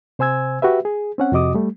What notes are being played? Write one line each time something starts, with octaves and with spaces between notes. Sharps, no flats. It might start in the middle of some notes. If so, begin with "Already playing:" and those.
C3 C5 G#5 E6 G#6
F#4 G4 B4 E5
G#4
C4 C#4 F#5
F2 C3 F#4 D#5 D6 D#6
G3 A3